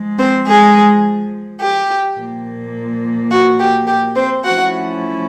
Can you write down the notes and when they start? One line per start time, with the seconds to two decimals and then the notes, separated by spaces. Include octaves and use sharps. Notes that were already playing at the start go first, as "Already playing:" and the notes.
Already playing: F3 G#3
0.18 C4 C5
0.47 G#3 G#4
1.60 G4
2.17 A#2 F3 A#3
3.30 F#4
3.59 G4
3.87 G4
4.15 C4 C5
4.44 F3 A3 C#4 E4 F#4 F#5